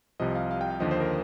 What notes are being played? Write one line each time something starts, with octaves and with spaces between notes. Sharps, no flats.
C2 C3 F3 D#5
F5
F5
G5
F5
D#2 D3 F3 D#5
C5
A#4